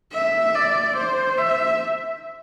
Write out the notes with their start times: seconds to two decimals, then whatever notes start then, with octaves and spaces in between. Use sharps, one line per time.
0.13 E5
0.55 D5
0.97 C5
1.38 E5